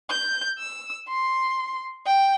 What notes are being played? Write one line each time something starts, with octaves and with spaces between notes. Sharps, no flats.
G6
E6
C6
G5